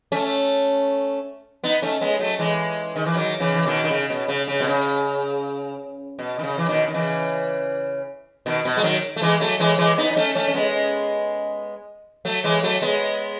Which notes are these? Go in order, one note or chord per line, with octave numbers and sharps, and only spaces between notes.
A3 C#4
B3 D#4
A3 C#4
G#3 B3
F#3 A3
E3 G#3
D#3
E3
D#3 F#3
C#3 E3
E3
B2 D#3
D#3
C#3
B2
C#3
C#3
B2
C#3
B2
D#3
C#3
E3
B2 D#3
D#3
C#3 E3
B2 D#3
B2
G#3
D#3 F#3
A3
E3 G#3
F#3 A3
E3 G#3
E3 G#3
B3 D#4
D#4
A3 C#4
A3 C#4
C#4
G#3 B3
F#3 A3
E3 G#3
F#3 A3
G#3 B3